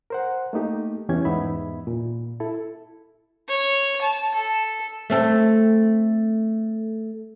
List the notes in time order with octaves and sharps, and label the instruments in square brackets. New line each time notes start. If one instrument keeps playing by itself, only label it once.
[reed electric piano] A#4 C5 F#5
A3 A#3 D#4 G4
E2 E3 C#4 G4 G#6
E2 G#2 B3 D#4 E5 B5
A#2
E4 A4
[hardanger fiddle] C#5
A5
A4
[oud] A3 C4 A4